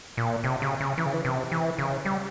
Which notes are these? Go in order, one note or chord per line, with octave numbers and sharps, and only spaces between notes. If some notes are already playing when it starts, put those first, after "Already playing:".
A#2
C3
C#3
C#3
E3
C#3
E3
C3
E3
C#3
G3